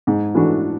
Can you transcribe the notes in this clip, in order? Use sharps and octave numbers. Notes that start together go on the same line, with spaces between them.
G#2
E3 A3 D4 F#4